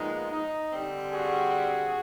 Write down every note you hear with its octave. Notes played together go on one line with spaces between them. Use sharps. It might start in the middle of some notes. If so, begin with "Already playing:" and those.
Already playing: A#2 F3 G#3 B3 D#4
D#4
D3 G3 C4
F#4 G#4